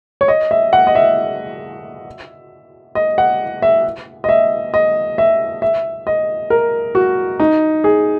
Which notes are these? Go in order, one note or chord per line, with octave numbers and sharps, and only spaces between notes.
C#5
D#5
E5
F#5
D#5
E5
D#5
F#5
E5
D#5
E5
D#5
E5
E5
D#5
A#4
F#4
D#4
G#4